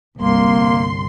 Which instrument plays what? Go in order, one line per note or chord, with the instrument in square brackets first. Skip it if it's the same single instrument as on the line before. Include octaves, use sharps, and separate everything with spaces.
[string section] G1 C2 C6 [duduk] A#3